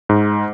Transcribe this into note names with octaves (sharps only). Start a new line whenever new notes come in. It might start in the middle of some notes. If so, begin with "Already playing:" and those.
G#2